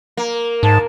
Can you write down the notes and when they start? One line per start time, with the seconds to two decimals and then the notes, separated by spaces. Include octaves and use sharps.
0.17 A#3
0.63 G#2 A5